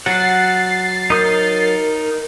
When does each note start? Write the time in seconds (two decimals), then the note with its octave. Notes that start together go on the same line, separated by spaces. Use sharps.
0.06 F#3 F#5 A6 C7
1.10 D#4 A#4 D#6 G6